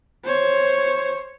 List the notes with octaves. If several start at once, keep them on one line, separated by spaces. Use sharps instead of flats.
C5 C#5